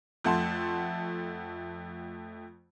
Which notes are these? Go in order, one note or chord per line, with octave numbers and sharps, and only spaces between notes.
F2 A3 F#5 A5 C6